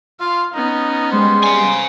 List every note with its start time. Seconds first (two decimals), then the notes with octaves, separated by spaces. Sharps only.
0.20 F4 F5
0.54 B3 C#4 D#4
1.12 G3 G#3 C5
1.44 F5 G#5